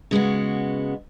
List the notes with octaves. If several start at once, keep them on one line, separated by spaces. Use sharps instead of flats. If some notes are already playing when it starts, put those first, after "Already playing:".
C#3 G#3 B3 F#4